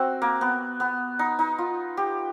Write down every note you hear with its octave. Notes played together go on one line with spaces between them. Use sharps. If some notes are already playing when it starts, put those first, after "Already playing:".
Already playing: C4 F#4
A#3
B3
B3
D#4
D#4
F4
G4